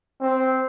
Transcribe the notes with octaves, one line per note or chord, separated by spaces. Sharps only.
C4